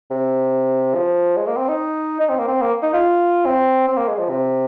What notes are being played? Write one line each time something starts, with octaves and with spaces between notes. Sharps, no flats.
C3
F3
G#3
A#3
C4
D#4
D#4
C4
A#3
C4
A#3
D#4
F4
C4
C4
A#3
G#3
F3
C3